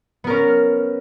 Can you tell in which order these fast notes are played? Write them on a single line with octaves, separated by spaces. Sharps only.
B3 A#4 C#4